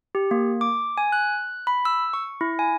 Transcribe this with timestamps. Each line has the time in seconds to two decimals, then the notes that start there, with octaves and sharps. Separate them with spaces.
0.15 G4
0.31 A#3
0.61 D6
0.98 G#5
1.12 F#6
1.67 B5
1.85 E6
2.13 C#6
2.41 E4
2.59 G#5